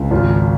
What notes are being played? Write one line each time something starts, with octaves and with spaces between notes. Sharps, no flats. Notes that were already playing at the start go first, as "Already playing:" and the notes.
Already playing: C#2
G#1 F4